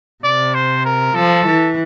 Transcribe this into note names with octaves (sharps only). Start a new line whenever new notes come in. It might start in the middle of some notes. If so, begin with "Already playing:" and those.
C3 D5
C5
A#4
F3 A4
E3